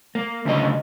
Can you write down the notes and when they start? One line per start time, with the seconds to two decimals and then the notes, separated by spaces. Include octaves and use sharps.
0.15 A#3
0.45 D2 C#3 B4 D#5